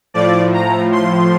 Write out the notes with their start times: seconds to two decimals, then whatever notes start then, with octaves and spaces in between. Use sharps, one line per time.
0.14 A2 F3 D5
0.54 A#5
0.92 C6